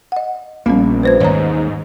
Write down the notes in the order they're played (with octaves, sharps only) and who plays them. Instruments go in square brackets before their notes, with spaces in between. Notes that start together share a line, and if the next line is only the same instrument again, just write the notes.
[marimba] D#5 F#5
[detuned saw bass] A#1 [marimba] G3 B3 C#4 [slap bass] A#3
[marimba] B4 C5 G#6
[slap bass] G#1 D#2 [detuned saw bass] G#2 [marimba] C#5 A#5